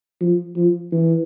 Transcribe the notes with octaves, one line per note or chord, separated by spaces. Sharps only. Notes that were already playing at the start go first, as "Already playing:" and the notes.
F3
F3
E3